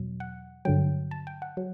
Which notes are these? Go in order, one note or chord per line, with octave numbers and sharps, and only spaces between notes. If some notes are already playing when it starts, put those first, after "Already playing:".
Already playing: E2 B2 F#3
F#5
G2 D3 F#3 G5
A5
G5
F#5
F#3